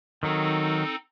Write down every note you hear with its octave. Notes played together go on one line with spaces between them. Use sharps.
D#3 F#3 C4 D#4 A4